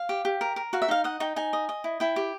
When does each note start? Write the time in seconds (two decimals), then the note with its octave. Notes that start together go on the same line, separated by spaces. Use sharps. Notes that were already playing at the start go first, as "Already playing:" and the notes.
Already playing: F5
0.09 G4
0.25 G4
0.41 A#4
0.56 A#4
0.73 F#4 F5
0.82 E5
0.88 D#4 F5
1.04 D#5 F#5
1.20 D#4 G5
1.36 D#4 G#5
1.53 D#5
1.69 D#5
1.84 E4
2.00 E4 G5
2.16 G4